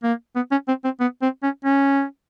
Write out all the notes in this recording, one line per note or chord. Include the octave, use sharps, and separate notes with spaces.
A#3
B3
C#4
C4
C4
B3
C4
C#4
C#4